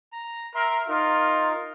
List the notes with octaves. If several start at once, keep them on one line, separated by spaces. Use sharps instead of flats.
A#5
A#4 E5 C6
D#4 F4 A#4